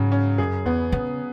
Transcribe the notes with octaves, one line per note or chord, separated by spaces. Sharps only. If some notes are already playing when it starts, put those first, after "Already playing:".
Already playing: G#2 C#3 F#3 C#4
C#4
F#2 G#4
E2 B3
C#3 B3